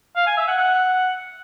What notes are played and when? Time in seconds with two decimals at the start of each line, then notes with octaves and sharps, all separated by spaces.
0.16 F5
0.27 G#5
0.37 E5
0.48 F#5
0.58 F#5